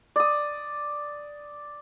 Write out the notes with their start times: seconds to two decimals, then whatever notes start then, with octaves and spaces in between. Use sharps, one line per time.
0.16 D5 D#6